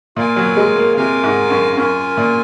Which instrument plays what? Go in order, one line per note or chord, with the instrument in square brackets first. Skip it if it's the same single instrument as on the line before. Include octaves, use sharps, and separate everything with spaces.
[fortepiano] A#2 [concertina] F4 A#4 F5 G#5
[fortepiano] F#3
G#3
A#3
[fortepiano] C3 [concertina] F4 A#4 F5 G#5
[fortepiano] G#2
F#2
[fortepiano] F#2 [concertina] F4 A#4 F5 G#5
[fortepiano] A#2